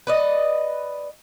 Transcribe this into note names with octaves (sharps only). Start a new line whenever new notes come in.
B4 D5 D#5